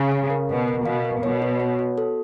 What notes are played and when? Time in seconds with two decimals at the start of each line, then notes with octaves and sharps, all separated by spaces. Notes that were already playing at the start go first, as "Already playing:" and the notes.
Already playing: C#3
0.12 F5
0.30 A#4
0.49 B2 A#4
0.68 A#4
0.86 B2 F5
1.04 A#4
1.23 B2 C#5
1.42 F#4
1.60 C#5
1.79 F#4
1.98 A4